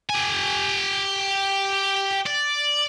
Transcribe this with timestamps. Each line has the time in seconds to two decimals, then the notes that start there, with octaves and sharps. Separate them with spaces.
0.09 G4 G#5
2.27 D5